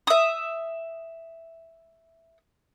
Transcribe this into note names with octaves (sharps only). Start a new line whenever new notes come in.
E5 D#6